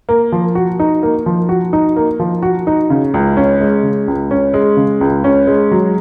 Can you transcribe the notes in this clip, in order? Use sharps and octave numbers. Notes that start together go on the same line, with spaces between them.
A#3
F3
F#4
D#4
A#3
F3
F#4
D#4
A#3
F3
F#4
D#4
C#3
C#2
C#4
G#3
C#3
C#2
C#4
G#3
C#3
C#2
C#4
G#3
F#3